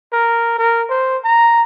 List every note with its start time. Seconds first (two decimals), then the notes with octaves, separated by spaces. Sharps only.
0.12 A#4
0.58 A#4
0.90 C5
1.24 A#5